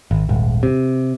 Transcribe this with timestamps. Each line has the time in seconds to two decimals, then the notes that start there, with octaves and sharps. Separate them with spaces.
0.11 G#1
0.29 D#1 G#1
0.63 C3